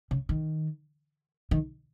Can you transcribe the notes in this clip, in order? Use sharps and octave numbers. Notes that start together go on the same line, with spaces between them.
C#3
D#3
D#3